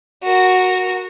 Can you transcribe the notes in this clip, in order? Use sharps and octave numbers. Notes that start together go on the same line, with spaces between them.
F#4 A#4